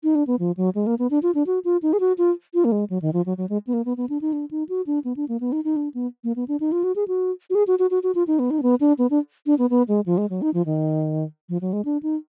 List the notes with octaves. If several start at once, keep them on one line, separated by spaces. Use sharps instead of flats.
D#4
D4
B3
F3
F#3
G#3
A#3
B3
D4
F4
D4
F#4
F4
D#4
G#4
F#4
F4
F4
A#3
G#3
F#3
D#3
F3
F#3
F#3
G#3
B3
A#3
B3
B3
D4
D#4
D4
D#4
F#4
D4
B3
D4
A#3
B3
D#4
D#4
D4
B3
A#3
B3
D4
D#4
F4
F#4
G#4
F#4
F#4
G#4
F#4
F#4
F#4
F#4
F4
D#4
B3
D#4
D4
B3
D4
B3
D4
D4
B3
B3
G#3
F3
G#3
F#3
D#4
F3
D#3
F3
F#3
G#3
D4
D#4